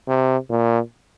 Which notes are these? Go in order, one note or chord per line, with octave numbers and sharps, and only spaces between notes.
C3
A#2